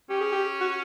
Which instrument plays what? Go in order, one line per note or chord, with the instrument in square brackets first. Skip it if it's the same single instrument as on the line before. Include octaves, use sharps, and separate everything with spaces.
[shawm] C#4 [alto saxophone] G4
[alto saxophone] G#4
G4
F#4